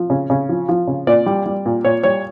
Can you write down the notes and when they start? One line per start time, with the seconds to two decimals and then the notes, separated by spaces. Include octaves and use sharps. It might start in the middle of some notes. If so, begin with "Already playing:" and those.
Already playing: F3
0.10 C#3
0.30 C#3
0.49 F3
0.69 F3
0.88 C#3
1.07 A#2 D5
1.26 G3
1.46 G3
1.66 A#2
1.85 A#2 C#5
2.03 G3 C#5